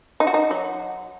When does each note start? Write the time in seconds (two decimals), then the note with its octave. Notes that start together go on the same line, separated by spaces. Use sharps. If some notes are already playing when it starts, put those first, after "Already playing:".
0.20 D#4
0.27 F#4
0.34 D#4
0.51 F#3